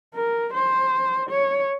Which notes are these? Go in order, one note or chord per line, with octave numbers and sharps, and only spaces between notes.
A#4
C5
C#5